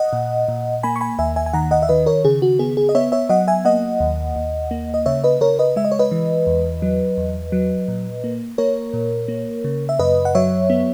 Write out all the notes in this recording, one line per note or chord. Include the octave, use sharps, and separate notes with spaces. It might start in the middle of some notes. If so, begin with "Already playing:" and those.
Already playing: D#5 F#5
A#2
A#2
A#3 G#5 B5
C#6
G#5 B5
D#2 E5 G#5
E5 G#5
G#5
D#3 F#5 A#5
D#5 F#5
E5
D#3 B4 D#5
A#4 C#5
C#3 G#4
F#4
B3 G#4
G#4
D#5
B3 C#5 E5
C#5 E5
F#3 D#5 F#5
E5 G#5
A#3 D#5 F#5
D#2
D#2
A#3
D#5
C#3 C#5 E5
B4 D#5
C#3 A#4 C#5
B4 D#5
G#3 E5
D#5
C#5
B4 D#5
E3
E2
F#3
E2
F#3
A#2
A#3
A#3 A#4 C#5
A#2
A#3
C#3
E5
F#2 B4 D#5
F#5
F#3 C#5 E5
B3